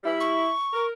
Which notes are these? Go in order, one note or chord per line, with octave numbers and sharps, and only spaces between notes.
G3 E4
C#6
A#4